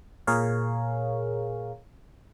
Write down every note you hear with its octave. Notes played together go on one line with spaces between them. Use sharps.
A#2 G#4 A#4 C#5 F5